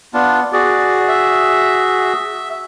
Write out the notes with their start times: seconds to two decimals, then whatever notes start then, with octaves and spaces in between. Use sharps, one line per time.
0.14 B3 D4 F4
0.53 F#4 G#4 D5
1.08 E5